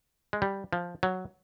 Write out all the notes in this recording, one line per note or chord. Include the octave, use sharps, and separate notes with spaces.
G#3
G3
F3
F#3